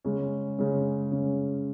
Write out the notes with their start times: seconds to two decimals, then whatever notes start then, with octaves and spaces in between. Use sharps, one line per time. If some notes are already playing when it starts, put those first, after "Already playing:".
0.05 C#3 G#3 C#4
0.58 C#3 G#3 C#4
1.11 C#3 G#3 C#4